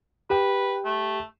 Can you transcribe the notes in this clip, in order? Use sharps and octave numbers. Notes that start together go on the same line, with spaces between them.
G4 B4 G5
A3